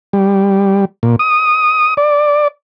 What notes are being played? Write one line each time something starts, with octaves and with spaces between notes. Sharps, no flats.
G3
A#2
D#6
D5